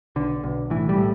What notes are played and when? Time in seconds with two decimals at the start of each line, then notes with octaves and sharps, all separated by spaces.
0.16 B1 D3
0.44 B1
0.70 A2 E3
0.89 G3
0.98 A2